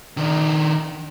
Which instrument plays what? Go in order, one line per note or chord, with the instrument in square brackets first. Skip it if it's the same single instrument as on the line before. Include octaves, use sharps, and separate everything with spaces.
[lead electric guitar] D#3 D4